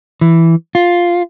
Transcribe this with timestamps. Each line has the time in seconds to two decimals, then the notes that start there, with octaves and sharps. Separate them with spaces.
0.21 E3
0.75 F4